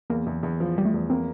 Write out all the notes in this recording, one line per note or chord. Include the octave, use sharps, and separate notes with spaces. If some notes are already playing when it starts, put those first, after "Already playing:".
E2 A#3
E2
E2
F3
F3 G3
A3
E2
A#3 C4